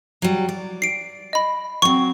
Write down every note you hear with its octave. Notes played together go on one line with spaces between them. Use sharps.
F#3 G3
D5
C7 D7
D#5 B5
F#3 C4 C#6